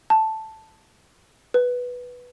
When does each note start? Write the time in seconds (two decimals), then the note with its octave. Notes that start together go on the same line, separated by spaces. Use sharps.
0.10 A5
1.54 B4